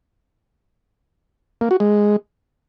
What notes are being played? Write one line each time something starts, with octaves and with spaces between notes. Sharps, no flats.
A#3
F#4
G#3